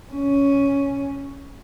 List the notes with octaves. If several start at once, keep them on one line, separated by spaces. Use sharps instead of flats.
C#4